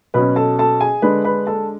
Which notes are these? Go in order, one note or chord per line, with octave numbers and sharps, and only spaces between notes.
B2 F#3 C#4 B4 B5
A4 A5
A4 A5
G#4 G#5
D3 G#3 D4 B4 B5
B4 B5
A4 A5